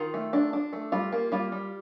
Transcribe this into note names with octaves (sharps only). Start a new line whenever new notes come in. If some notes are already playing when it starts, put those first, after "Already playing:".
Already playing: D#3 F4
A3
D4
D4
A3
G3 F4
A#3
G3 F4
G3